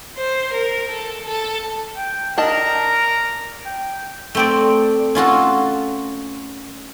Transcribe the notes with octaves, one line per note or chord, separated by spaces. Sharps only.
C5
A#4
A4
A4
G5
D4 A#4 D#5 A5 A#5
G5
A3 C4 D5
C#4 F4 F#4 A4